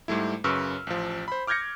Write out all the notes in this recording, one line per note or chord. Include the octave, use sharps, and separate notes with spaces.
G#2 G3 A3 E4
F#2 C#3 B4 C#6 E6 F6
A1 F3
C5 B5
D6 F6 G6 G#6 A#6 C#7